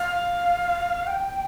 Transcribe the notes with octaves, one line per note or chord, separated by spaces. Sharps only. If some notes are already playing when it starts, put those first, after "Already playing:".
Already playing: F5
G5